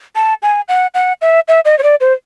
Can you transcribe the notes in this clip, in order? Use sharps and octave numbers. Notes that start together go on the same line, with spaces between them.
A5
G#5
F#5
F#5
E5
E5
D#5
C#5
D5
C5